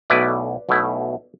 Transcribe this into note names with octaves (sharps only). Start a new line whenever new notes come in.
B1 B2 A3 E4 B4 D5
B1 B2 A3 E4